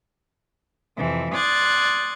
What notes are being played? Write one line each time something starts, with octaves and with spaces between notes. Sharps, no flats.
F2 C3 E3
D5 C6 D#6 F#6 G#6 A6